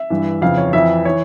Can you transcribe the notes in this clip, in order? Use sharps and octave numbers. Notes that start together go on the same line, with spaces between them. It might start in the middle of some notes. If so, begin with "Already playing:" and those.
Already playing: E5
G2 E3
F2 C#3 E3 F5
C#5
F2 E3 E5
E3 C#5